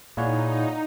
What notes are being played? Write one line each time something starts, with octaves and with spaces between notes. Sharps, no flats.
A#2 D#4 E4 G#4 C#5 D5 F5 F#5